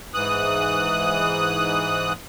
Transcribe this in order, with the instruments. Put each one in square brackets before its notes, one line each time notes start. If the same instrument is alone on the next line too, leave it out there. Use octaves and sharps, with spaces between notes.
[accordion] G#2 E3 D#6 F#6